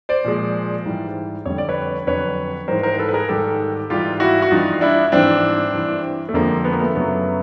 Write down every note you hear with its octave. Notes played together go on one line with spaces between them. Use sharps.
C5 D5
A#2 F3 G#3
G#2 E3 G3
F2 D3 G3 C#5
D5
B4 C#5
F2 D3 F#3 B4 C#5
G#2 E3 G3 A#4 C5
A#4 C5
A4 B4
B4
G#4 A#4
G#2 D#3 G3 G4 A4
G#2 E3 G3 F4 G4
E4 F#4
F#4
G2 E3 G3 D#4 F4
D4 E4
G#2 E3 G3 C4 D4
G2 E3 G3
A3
F2 D3 F3 G#3 A#3
B3
A#3
A3 B3
F#2 C#3 F#3 A3 B3